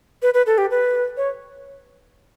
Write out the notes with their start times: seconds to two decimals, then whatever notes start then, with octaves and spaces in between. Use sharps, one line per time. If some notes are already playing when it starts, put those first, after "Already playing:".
0.22 B4
0.34 B4
0.46 A4
0.58 G4
0.71 B4
1.17 C#5